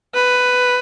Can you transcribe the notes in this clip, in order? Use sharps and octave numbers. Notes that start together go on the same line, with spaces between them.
B4